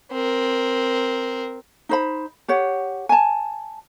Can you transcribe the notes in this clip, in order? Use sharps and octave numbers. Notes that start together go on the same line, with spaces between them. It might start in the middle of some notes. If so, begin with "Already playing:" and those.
C4 A#4
D#4 C5 B5
G4 C#5 F#5
G#5 A5